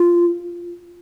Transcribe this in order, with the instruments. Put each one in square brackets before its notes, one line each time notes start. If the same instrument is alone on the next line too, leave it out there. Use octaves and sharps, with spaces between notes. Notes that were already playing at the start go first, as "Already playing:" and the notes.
Already playing: [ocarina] F4